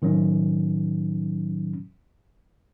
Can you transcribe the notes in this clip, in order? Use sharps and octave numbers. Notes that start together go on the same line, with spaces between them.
A2 D#3 F#3 C#4